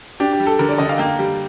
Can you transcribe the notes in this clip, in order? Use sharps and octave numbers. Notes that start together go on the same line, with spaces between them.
D4 G4
G4
G3
A4
D3 A#4
D5
D3 D#5
F5
A#3 G5
G3